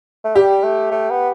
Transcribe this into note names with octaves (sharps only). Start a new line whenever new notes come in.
A3
G3 G4
A3
A3
B3